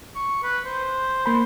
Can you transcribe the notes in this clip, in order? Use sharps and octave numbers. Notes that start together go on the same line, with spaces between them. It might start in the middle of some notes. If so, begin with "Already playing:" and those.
C#6
B4
C5
A#3 C5 B5